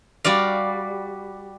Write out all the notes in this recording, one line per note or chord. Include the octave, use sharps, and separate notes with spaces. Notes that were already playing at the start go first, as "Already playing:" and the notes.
G3 F#4 D5 F5